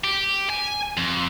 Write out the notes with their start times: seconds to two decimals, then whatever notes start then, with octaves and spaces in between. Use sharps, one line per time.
0.04 G4
0.50 G#5
0.97 F2